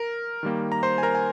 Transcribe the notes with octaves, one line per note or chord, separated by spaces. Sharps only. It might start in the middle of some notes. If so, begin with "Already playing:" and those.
Already playing: A#4
D#3 G3 A#3
A#5
C5 C6
G#5
A#4 A#5
G#5